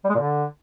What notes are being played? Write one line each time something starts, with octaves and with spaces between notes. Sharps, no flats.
G3
G#3
A#2
D3